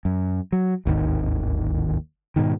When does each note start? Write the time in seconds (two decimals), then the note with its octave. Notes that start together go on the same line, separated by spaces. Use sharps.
0.05 F#2
0.52 F#3
0.85 D1 G#1 D#2 D#3
2.36 G#2 B2 D#3